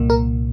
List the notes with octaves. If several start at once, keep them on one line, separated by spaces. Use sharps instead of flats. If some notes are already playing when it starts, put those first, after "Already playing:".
Already playing: C2 A#2 A#3
A#4